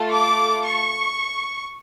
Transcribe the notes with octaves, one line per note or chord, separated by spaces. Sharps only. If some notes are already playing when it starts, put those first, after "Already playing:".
Already playing: A3 F4 A4
D6
C#6